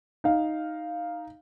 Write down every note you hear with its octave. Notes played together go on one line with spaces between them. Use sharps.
D#4 F5